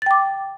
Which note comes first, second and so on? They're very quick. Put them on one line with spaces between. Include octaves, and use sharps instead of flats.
A6 G5 D6